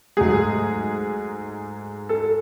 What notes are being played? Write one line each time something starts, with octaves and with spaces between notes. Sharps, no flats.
G#2 F#3 A3 G#4
A4